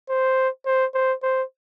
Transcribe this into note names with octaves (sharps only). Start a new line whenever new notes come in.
C5
C5
C5
C5